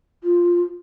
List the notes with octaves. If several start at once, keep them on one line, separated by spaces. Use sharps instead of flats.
F4